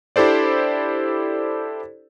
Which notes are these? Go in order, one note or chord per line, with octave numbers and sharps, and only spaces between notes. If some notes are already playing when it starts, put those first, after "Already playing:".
D4 E4 G4 A4 C5 D5